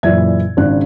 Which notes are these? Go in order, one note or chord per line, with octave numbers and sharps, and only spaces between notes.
F#1 A#2 E3 D5 E5 G#6
G#1 C#3 D4 F#6